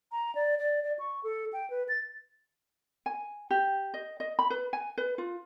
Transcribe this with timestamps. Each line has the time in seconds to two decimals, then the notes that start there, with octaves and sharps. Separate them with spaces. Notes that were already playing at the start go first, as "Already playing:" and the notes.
0.12 A#5
0.35 D5
0.59 D5
0.83 D5
0.99 C#6
1.23 A4
1.53 G5
1.70 B4
1.89 A6
3.06 G#5
3.50 G4
3.94 D#5
4.20 D#5
4.39 B5
4.50 B4
4.73 G#5
4.98 B4
5.18 F4